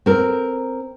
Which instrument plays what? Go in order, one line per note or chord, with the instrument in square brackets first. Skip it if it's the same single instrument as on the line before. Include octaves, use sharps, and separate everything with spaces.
[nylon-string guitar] C4 A#4